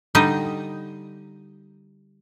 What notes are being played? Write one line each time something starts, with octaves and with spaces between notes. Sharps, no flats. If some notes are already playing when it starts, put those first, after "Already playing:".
D3 G3 D#4 D#5 G5